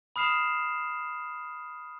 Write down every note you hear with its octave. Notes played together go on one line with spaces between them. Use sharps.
B5 D#6 F6 C7 E7 F7